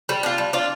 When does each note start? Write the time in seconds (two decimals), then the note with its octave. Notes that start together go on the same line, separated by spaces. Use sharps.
0.09 G3
0.23 D4 F4
0.38 G3
0.53 D4 F4